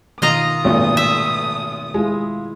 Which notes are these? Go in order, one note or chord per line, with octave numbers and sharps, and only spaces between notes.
B2 D#3 F4 D#5 A#5 D#6
G#1 A#2 A3 B3 F#4
E5
G#3 E4 F4